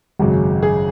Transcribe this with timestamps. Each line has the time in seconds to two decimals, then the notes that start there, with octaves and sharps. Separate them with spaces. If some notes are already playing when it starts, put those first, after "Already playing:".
0.19 G#1 F#2 C#3 F#3
0.63 G#4